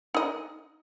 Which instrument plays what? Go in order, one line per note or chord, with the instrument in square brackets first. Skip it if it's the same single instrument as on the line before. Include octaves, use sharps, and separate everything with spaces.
[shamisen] D#4 D#5